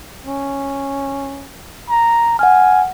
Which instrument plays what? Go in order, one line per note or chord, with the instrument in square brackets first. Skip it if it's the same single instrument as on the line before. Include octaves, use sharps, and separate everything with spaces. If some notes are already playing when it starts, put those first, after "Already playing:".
[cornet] C#4
A#5
[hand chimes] F#5 F6 [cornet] G#5